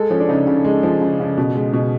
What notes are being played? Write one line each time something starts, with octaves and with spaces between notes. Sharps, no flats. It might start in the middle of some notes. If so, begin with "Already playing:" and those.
Already playing: G#3 A4
F3 C#4
D4
C#3 D#4
C#3
G#3
F3
C#3
C#3
B2
G#3
B2